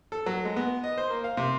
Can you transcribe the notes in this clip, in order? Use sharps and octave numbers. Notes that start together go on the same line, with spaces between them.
A4
F#3
G#3
B3
D#5
C5
A#3
F5
C3